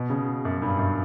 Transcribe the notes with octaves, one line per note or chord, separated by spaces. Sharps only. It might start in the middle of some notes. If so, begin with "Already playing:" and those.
Already playing: B2
C#3
F#2
G2
F#2